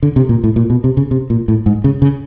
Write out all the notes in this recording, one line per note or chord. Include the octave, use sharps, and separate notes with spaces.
D3
C3
A#2
A2
A#2
B2
C3
C#3
C3
A#2
A2
G#2
C#3
C#3